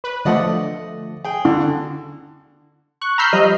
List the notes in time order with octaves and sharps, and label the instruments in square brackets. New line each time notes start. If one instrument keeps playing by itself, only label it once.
[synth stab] B4
[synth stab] D3 F3 A3 [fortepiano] D5 D#5 F#5
[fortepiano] G#4 G5
[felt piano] D3 [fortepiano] F#4
[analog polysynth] C#6 F#6
A#5 B5 E6 F6 G6 C7
F3 G3 D#5